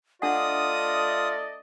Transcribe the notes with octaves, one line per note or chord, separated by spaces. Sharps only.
A3 D4 F4 D5 D#5 F#5 D#6